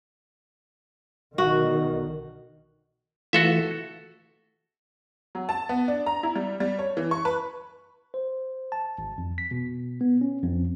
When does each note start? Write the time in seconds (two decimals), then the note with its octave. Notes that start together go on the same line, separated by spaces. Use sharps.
1.38 B1 D3 D#3 F#4
3.33 E3 A3 F4 F#4 A4 E5
5.35 F#3
5.49 A5
5.69 B3
5.88 D4
6.06 A#5
6.23 E4
6.36 G3
6.60 G3
6.79 C#5
6.97 E3
7.11 C#6
7.25 B4
8.14 C5
8.72 A5
8.98 G#1
9.18 F2
9.38 B6
9.51 B2
10.01 B3
10.21 C#4
10.43 F2